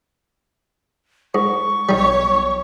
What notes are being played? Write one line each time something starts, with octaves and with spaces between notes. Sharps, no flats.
G#2 C#6
B1 G3 D#4 C#5